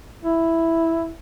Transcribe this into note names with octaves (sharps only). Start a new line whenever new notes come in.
E4